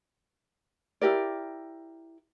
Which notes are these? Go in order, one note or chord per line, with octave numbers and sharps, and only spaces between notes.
E4 G4 A#4 D5